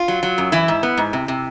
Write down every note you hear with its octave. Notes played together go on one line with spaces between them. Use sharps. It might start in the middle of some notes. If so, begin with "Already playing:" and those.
Already playing: F4
F#3
F#3
F#2
E3 E4
G#2
B3
G#2
C3
C3